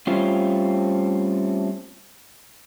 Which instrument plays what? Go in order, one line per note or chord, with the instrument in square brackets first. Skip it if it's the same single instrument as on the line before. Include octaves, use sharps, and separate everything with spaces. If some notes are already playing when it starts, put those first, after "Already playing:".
[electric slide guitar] G3 A3 C4 C#4 F4